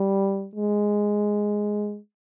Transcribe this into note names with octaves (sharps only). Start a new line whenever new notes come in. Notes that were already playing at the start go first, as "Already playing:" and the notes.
Already playing: G3
G#3